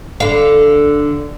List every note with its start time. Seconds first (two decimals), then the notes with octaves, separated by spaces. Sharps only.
0.20 D3 F5